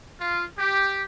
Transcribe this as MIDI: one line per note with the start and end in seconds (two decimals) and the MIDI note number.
0.20 0.45 65
0.59 1.03 67